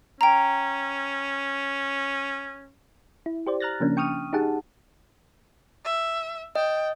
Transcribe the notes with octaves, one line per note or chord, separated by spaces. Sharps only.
C#4 G5 A#5
E4
G4 C5 D5
A#5 F6 F#6 A6 A#6
C#3 F3 A#3 C#4 D4
G5 C#6 D#6 F6 D#7
D#4 G4 G#4 F#5 A5
E5
D#5 G5